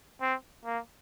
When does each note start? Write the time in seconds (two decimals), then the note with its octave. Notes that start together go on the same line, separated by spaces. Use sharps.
0.21 C4
0.65 A#3